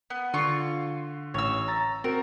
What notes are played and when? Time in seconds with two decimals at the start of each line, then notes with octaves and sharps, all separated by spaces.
0.10 B3
0.34 D3 F4 C#6
1.34 A1 C#5 E6
1.68 A#5 A6
2.04 C4 F#4 A#4